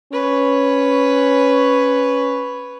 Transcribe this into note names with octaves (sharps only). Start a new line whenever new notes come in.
C#4 B4 C#5